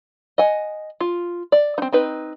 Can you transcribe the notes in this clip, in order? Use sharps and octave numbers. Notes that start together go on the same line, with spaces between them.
D#5 F#5 G#5
F4
D5
C4 D#4
C4 D#4 B4